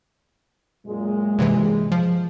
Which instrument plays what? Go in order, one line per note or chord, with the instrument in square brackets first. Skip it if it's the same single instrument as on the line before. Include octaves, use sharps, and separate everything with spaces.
[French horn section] F#2 A#2 G#3
[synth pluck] G2 C3 E3
F3